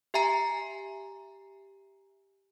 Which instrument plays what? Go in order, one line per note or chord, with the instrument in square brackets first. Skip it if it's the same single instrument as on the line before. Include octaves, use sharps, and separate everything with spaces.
[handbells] G4 E5 G#5 A#5 C7